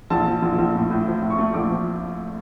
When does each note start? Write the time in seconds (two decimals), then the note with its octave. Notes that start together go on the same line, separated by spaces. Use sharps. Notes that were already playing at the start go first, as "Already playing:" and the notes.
0.10 A#1 A5
0.26 F3
0.42 A#1
0.58 A#1
0.75 A2
0.90 A2
1.07 F3
1.22 A2
1.30 C#6
1.38 A3
1.54 A#1 D6
1.70 F3